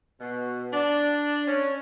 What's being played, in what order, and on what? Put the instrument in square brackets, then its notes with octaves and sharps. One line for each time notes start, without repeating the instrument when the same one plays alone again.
[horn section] B2
D4
C#4